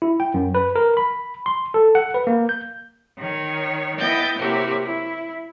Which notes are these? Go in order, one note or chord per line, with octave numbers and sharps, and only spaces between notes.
E4
G5
F#2
B4
A#4
B5
C6
A4
F#5
B4
A#3
G6
D#3 C#5
B3 E4 D#5 G5 G6 A6
C3 F#3 A#3 E4 F#4 G4
E4